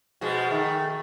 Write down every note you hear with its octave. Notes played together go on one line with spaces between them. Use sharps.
B2 F3 G#3
D#3 A3